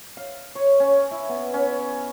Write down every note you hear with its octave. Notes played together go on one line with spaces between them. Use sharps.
F5
C#5
C#4
E4
B3
C#4